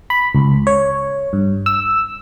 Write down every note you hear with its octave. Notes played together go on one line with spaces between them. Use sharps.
B5
C#2
C#5
G2
E6